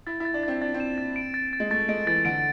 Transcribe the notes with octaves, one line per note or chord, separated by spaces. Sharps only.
E4 A6
E4 A6
D4
C4 A6
D4 A6
C4
E7
A6
D7
A6
A6
G#3
A3 A6
G#3 D7
E3 A6
D3 D7